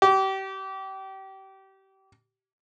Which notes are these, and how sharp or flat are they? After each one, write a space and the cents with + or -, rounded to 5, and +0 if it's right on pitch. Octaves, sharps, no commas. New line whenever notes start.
G4 -30